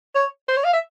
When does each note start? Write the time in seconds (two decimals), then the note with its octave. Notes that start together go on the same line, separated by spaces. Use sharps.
0.15 C#5
0.48 C5
0.57 C#5
0.64 F5
0.74 E5